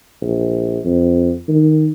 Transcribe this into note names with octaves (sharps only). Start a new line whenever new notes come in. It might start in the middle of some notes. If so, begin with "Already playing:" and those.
A#1
F2
D#3